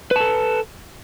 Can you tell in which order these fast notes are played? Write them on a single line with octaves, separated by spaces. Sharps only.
B4 A5 A4